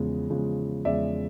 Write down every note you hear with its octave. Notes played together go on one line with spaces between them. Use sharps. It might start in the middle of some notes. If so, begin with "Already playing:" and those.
Already playing: E2 C#3 F3 G#3
E2 C#3 F3 G#3
E2 C#3 F3 G#3 D5 E5